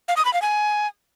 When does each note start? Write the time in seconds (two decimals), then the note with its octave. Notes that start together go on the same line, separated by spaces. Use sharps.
0.08 F5
0.17 D#6
0.25 B5
0.33 F5
0.42 G#5